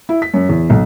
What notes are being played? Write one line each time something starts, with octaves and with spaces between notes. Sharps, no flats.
E4
B6
F#2
E2
B1